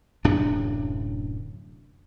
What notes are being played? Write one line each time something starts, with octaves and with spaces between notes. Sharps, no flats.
D1 F#2 C3 D4